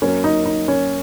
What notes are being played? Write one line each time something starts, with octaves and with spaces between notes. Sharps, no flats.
F#2 F#3 A#3 C#4
D#4
D#4
C#4